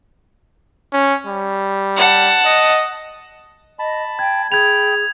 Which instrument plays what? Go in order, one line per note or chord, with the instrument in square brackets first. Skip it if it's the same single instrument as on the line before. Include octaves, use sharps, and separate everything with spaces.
[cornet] C#4
G3
[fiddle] F#5 A5
[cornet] D#5
[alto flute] D#5 [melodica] A5 B5
[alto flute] G5 [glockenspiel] G#6
[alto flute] G#4 [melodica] G5 B5 [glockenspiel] G#6 F7